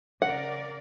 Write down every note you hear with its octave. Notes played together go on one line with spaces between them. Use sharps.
C#3 A#4 D5 F#5